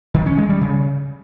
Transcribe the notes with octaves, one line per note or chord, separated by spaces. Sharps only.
D#3
C#4
G#3
G3
C#3